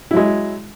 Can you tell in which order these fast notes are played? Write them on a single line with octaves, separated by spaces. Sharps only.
E4 F#3 G#3